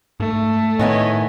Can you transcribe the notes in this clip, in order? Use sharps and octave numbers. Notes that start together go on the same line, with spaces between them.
G#2 A3
A2 D#3 B3 E4 C#5 D#5 G#5